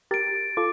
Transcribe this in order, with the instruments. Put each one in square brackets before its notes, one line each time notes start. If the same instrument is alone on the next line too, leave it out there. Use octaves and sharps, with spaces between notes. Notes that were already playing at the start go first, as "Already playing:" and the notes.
[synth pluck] G4 A#4 [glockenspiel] A6 D7
[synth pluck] F4 A4 [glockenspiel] D6